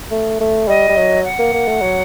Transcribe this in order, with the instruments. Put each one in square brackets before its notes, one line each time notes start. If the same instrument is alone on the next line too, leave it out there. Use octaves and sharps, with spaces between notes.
[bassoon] A3
A3
[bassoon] G3 [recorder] D#5
[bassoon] G3
F#3
[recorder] F#5
[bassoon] A#3
A#3
A3
F#3